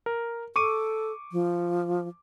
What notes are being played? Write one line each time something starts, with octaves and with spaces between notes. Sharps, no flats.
A#4
A4 C#6 D6 D#7
F3